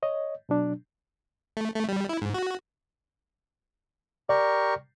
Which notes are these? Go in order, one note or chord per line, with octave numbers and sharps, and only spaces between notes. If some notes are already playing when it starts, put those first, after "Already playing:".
C#5 D#5
B2 F#3 D4
A3
A3
G3
E4
G#2
F#4
G4 A#4 D5 C#6